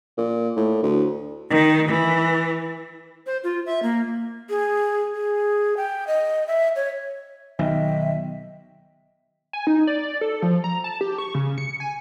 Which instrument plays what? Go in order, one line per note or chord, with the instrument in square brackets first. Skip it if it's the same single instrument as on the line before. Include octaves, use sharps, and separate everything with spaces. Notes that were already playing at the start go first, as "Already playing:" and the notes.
[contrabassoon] A#2
A2
D2
[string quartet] D#3
E3
[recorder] C5
F4
E5
A#3
[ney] G#4
G#4
G5
D#5
E5
C#5
[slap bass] B1 [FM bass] D#3 [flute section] D#5 E5 G5
[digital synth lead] G#5
D#4
D5
A4
F3
A#5
A5
G4
C#6
C#3
C#7
G#5